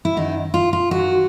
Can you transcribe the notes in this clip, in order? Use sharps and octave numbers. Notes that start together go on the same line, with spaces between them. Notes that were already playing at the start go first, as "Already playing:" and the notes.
E4
F#2 D#3 D#4
F4
F4
F#2 D#3 F#4